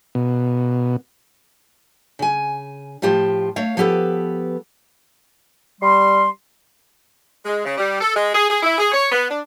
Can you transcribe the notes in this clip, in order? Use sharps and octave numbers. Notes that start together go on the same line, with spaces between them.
B2
C#3 G#5
A2 F3 F4 G4 A5
A3 C#5 F5
F3 B3 G4 A4 B4
G3 C6
G#3
C#3
G3
A4
G#3
G#4
G#4
E4
G#4
C#5
B3
D4